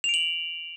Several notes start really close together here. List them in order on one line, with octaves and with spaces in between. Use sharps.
F7 D7 F#7